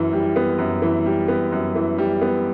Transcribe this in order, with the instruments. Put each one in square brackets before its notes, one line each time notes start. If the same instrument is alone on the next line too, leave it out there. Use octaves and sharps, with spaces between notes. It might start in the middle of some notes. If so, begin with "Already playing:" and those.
Already playing: [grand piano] F#2 E3
G3
B3
F#2
E3
G3
B3
F#2
E3
G3
B3